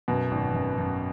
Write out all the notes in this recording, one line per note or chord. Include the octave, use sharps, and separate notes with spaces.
F#2 B2
G#1
F#2
F#2